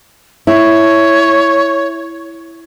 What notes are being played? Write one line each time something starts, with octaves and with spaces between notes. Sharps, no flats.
E4 C#5